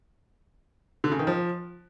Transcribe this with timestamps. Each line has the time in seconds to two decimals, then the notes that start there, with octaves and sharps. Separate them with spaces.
1.04 D3
1.12 C#3
1.19 D#3
1.27 F3